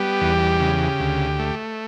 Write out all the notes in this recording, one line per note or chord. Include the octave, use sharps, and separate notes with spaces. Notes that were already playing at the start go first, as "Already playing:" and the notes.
Already playing: G3 B3 G4
E2
C#3
D2
A3